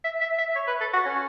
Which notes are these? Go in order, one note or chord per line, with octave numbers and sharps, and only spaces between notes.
E5
E5
E5
C#5
B4
A4
F#4
C#4